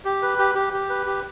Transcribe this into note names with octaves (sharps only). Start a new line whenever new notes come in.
G4
B4
G4
G4
G4
B4
G4